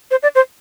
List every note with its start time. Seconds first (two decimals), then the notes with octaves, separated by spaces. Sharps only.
0.11 C5
0.23 D5
0.35 C5